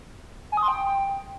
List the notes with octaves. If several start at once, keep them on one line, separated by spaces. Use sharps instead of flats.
G#5
D#6
C6
G5